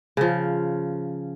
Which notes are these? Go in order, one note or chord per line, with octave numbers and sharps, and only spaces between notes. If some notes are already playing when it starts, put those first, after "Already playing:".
C#3 F3